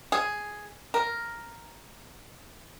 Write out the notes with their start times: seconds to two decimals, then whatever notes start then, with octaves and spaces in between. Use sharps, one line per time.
0.12 G#4
0.94 A#4